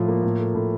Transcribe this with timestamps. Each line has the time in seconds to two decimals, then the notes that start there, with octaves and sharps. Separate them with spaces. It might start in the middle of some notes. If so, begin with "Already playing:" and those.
Already playing: A2 F3 F4
0.08 A#3
0.23 A2
0.39 A3
0.55 A2